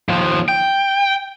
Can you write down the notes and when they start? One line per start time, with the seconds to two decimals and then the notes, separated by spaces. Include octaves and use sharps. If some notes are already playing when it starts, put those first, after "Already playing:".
0.09 D#2 F3
0.48 G5